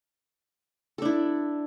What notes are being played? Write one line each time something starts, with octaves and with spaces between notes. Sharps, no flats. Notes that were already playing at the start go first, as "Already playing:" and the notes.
D4 E4 A4